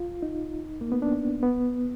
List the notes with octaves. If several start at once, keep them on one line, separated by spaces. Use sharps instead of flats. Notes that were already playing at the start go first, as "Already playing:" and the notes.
Already playing: F4
D#4
A#3
B3
D4
B3